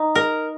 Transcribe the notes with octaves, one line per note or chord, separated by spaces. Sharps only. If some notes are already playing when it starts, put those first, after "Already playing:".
Already playing: D#4
A#4